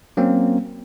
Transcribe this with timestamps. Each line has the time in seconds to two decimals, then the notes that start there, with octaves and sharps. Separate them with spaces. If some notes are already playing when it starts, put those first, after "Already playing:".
0.17 F#3 A#3 C4 C#4